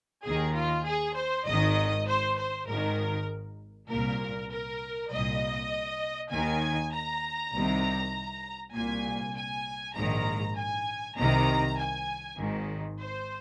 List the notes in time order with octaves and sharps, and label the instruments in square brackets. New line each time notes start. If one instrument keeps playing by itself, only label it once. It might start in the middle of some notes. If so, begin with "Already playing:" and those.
[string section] D#2 D#3 G#4
F4
G#4
C5
G#1 G#2 D#3 D#5
C5
C5
G#1 G#2 D#3 A#4
C2 A#2 A#4
A#4
C2 A#2 D#5
D#2 D#3 G#5
A#5
C2 C3 D#3
C2 A#2 G#5
G#5
A#1 G#2 D#3 A#5
G#5
C2 C3 D#3 A#5
G#5
G#1 G#2 D#3
C5